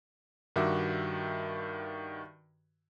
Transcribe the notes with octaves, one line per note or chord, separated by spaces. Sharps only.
G2 D#3 F#4 E5 D6